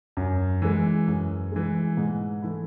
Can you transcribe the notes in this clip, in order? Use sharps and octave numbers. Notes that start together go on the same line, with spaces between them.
F#2
E3 G#3
F#2
E3 G#3
G#2
E3 A3 E4